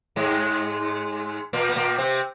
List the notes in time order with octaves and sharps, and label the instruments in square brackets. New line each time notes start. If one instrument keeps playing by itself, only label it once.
[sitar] G#2 G#3
A#2 A#3
B3
A#2 A#3
C3 C4